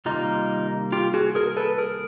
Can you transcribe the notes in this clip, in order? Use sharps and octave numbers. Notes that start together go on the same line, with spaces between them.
C3 D#3 G3 A#3 D#4 F4
F4 G4
F#4 G#4
G#4 A#4
A4 B4
G#4 A#4